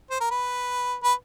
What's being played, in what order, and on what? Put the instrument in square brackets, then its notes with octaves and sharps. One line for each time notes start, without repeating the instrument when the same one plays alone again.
[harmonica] C5
A#4
B4
B4